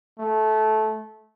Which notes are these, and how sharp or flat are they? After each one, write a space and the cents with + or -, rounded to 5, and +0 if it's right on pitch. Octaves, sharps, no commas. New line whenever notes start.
A3 -20